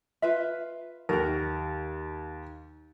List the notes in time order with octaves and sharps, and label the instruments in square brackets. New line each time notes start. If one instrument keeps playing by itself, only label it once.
[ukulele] F4 B4 E5
[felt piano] D#2 [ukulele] A#4 F#5